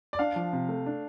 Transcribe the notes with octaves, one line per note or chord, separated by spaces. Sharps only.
D5
D4 F5
F3
C3
A3
D4